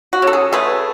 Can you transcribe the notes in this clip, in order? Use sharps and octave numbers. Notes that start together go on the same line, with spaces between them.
F#4
C#3 A4
G#4
A3 G#4 B4